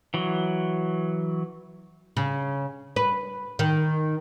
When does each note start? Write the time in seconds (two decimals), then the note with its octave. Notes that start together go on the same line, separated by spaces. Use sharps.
0.14 E3 F#3
2.17 C#3
2.96 B4
3.59 D#3